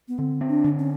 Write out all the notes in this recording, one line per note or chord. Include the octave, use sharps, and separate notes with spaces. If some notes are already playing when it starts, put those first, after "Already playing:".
B3
D3 C4
C4
D4
D3
C#4